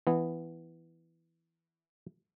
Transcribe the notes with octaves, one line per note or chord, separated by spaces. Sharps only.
E3 B3